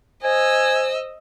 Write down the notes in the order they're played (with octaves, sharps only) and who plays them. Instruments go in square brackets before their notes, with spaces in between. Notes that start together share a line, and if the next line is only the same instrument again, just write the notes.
[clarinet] C5 [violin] D#5 E6 [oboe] G#5